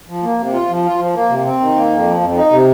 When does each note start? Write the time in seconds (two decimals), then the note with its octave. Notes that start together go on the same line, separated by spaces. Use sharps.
0.08 F3
0.23 A#3
0.38 C3
0.54 F4
0.69 F3
0.84 F4
0.99 F3
1.14 A#3
1.29 C3
1.45 C4
1.60 D#3
1.75 A#3
1.90 F2
2.06 F3
2.21 F2
2.36 D#4
2.51 C3